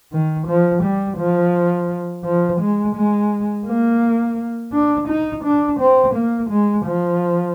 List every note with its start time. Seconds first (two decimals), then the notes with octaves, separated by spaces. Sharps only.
0.12 D#3
0.47 F3
0.83 G3
1.18 F3
2.25 F3
2.60 G#3
2.95 G#3
3.66 A#3
4.73 D4
5.08 D#4
5.44 D4
5.80 C4
6.15 A#3
6.50 G#3
6.86 F3